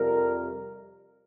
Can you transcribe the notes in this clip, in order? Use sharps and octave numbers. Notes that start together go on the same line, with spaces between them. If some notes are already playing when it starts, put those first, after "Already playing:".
Already playing: F2 C3 G3 A#4